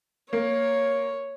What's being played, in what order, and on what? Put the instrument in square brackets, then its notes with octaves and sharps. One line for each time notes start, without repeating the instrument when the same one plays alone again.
[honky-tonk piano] A#3 [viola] C#5